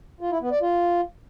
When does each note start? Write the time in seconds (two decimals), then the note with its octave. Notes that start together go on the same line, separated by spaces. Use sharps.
0.21 F4
0.31 E4
0.41 B3
0.51 D5
0.61 F4